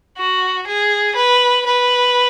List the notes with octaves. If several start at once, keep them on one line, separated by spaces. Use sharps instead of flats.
F#4
G#4
B4
B4